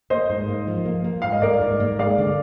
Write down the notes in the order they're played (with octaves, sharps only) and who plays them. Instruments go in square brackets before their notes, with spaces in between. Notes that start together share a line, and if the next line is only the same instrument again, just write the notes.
[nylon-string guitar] A#3 [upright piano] C5 D#5
[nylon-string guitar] G#2
A#3
F3
A#3
A#3
[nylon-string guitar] G#2 [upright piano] F5
[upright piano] D#5
[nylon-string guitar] A#3 [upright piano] A#4 D5
[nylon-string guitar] G#2
A#3
[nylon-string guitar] G#3 [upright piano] D5 F5
[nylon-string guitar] D3